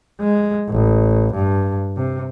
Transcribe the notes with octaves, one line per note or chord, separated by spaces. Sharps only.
G#3
A1
G2
C3